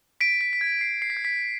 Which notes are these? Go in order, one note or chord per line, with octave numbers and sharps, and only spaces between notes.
B6 D7
B6
B6
G#6
C7
C7
B6
G#6
B6